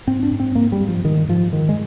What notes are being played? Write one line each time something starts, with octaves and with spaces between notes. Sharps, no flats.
G#2 C4
D4
G#2
C4
G#2 A#3
G3
G#2
F3
G#2 D#3
G#2 F3
G#2 D#3
G#3